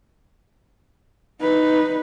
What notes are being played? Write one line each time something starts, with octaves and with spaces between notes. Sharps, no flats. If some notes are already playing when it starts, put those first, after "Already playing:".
D#4 B4